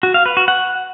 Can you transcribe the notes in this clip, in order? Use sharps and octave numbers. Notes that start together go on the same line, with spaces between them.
F#4
F5
B4
F#4
F#5